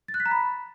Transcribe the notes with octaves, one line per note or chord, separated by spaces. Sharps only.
A6
F#6
B6
A#5
B5